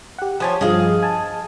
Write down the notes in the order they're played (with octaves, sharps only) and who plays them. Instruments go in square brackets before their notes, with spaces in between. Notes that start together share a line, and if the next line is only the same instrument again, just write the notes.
[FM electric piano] G4 F#5
[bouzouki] F3 G4 C#5 [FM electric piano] C5 G#5 A5
[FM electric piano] G2 F3 [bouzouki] G#4 D#5 F5
[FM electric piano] G#5 A5